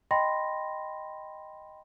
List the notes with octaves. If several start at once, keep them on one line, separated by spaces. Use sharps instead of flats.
D#5 G5 B5 C6 A#6